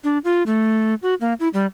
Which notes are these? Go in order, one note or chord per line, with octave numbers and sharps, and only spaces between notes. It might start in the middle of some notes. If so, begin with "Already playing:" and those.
D4
F4
A3
F#4
A#3
E4
G3